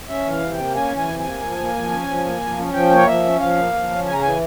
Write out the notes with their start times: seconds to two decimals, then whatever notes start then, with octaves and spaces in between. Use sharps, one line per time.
0.08 C#4 E5
0.25 E3
0.31 F5
0.42 C3
0.53 G5
0.58 A#3
0.74 C#4 G#5
0.91 E3
0.97 G#5
1.08 C3
1.19 G#5
1.25 A#3
1.41 F3
1.58 A#3
1.74 F3
1.91 C#4
2.07 F3
2.24 A#3
2.41 F3
2.58 C#4
2.73 F3 G5
2.90 A#3 C#5
3.07 F3 E5
3.23 C#4
3.40 F3 F5
3.57 A#3
3.73 F3
3.90 C#4
4.06 C#3 G#5
4.13 A#5
4.21 E3 G#5